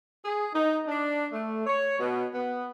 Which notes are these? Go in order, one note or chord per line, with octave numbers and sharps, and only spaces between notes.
G#4
D#4
D4
A3
C#5
B2
B3